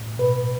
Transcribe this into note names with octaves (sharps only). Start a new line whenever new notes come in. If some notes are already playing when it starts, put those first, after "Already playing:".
Already playing: A2
B2 B4